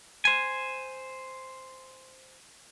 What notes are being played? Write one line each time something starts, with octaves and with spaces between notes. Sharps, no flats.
C5 G#5